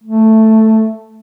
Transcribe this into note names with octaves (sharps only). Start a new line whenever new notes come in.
A3